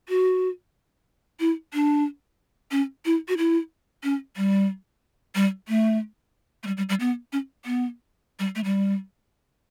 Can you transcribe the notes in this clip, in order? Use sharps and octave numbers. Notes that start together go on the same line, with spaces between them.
F#4
E4
D4
C#4
E4
F#4
E4
C#4
G3
G3
A3
A3
G3
G3
G3
B3
C#4
B3
G3
A3
G3